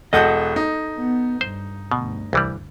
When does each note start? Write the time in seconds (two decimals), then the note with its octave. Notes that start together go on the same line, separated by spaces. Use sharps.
0.13 E1 A4 D#5 F#5 G6
0.56 D#4
0.98 B3
1.41 G2 C5
1.91 D2 G2 B2
2.33 C2 E3 G3